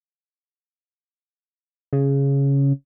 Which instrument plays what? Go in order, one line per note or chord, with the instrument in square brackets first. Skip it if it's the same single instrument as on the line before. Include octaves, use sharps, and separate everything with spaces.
[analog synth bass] C#3